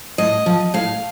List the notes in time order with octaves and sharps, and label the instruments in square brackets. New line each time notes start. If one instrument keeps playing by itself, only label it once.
[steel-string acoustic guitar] A2 D#5
F3
A2 F5